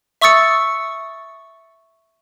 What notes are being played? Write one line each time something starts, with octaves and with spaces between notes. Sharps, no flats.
E5 C#6 D#6 E6 A6 C#7